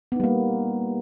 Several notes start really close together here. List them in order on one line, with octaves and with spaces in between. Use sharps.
B3 D#4 G3 A#3